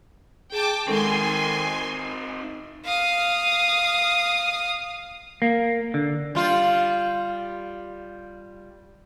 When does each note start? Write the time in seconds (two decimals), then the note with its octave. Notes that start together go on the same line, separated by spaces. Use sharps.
0.53 G#4 G5 A5 D6
0.88 D#3 G#3 C4 D#4 A4 G#5 C6 C#6
2.85 F5 D#6
5.42 A#3
5.94 D3
6.35 G3 F4